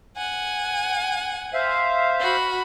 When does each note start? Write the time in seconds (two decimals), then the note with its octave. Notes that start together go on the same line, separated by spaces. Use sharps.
0.17 F#5 G#5
1.54 C5 E5 F5
2.20 F#4 B5